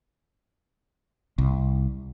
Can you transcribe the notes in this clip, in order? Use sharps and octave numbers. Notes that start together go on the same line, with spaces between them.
C2